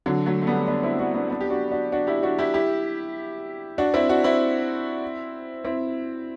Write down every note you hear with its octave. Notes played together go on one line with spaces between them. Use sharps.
D3 F#3
F#3 A3
A3
G3 B3
B3 D4
C4 E4
D4 F#4
B3 D4
B3 D4
G4
D4 F#4
D4 F#4
D4 F#4
E4 G4
D4 F#4
E4 G4
E4 G4
D4 F#4
C4 E4
D4 F#4
C4 E4
C4 E4